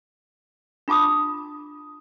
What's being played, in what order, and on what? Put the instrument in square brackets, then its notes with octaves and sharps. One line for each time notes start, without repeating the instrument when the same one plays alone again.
[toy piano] D4 F4 A5 D6 D#6